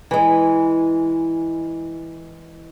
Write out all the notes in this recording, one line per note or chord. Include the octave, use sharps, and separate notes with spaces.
E3 G#3